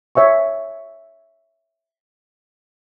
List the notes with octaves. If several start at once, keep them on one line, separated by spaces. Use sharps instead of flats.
C#5 E5 G#5 C#6